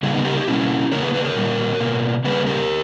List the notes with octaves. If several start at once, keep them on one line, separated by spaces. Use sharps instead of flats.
C#3 G3 A#3 E4 G#4
B3 D#4
G4 A#4
D#4 G4
B2 G3 A#3 C#4 E4
C#3 G3 A#3 A#4 C#5
G#4 B4
G#4 B4
A#4 C#5
A#2 G3 A#3
B2 A#3
C#3 G3 A#3 G#4 B4
G4 A#4